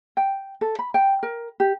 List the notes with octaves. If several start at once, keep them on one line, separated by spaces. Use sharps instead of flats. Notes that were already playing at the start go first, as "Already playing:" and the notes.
G5
A4
B5
G5
A#4
G4